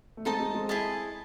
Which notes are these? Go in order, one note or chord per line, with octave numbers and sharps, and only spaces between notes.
A3
G#3 C4 D#4 A4 D#5 A5
G#3 C4
G#3 C4
E4 G#4 D#5 A5